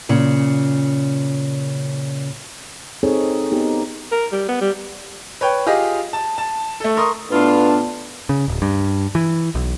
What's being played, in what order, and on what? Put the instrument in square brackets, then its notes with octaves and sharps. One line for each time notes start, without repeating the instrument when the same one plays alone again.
[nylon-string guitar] A#2 C#3
[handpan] C4 D#4 G#4 A4 C#5
B3 D#4 G4
[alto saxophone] A#4
G3
B3
G3
[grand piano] B4 C#5 G5
F4 G4 G#4 D#5
A5
A5
A3 A4
A#4 C6 C#6 D#6
[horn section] A2 F4 [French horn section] B3 [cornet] D4 [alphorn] B4
[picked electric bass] C#3
D1
G2
E3
B1